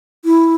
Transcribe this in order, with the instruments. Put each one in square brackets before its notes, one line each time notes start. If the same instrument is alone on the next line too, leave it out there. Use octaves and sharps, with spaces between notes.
[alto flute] E4